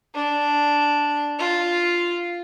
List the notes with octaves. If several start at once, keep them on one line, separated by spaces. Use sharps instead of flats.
D4
F4